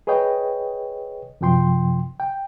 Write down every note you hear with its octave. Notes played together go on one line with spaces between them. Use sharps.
G#4 B4 C#5 D#5 G5
F#2 C3 F3 G5 C6
G5